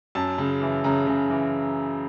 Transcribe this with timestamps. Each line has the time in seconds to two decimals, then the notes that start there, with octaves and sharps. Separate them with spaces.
0.15 F#2 A5
0.38 C#3
0.61 E3
0.84 C#3 A#5
1.07 C#3
1.30 E3